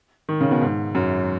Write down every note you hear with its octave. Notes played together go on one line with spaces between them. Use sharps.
D#3
C#3
B2
G#2
F#2